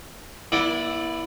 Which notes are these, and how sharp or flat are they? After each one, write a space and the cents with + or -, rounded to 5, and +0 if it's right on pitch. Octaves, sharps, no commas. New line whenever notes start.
B3 -45 E4 +0 D5 +0